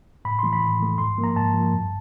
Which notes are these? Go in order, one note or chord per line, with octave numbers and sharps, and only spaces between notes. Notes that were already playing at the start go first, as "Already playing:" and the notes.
A2 B5
E3 A3 C6
B5
A2
E3 A3
G#2 C6
F3 A#3
A#5
G#2 A5
F3 A#3
G2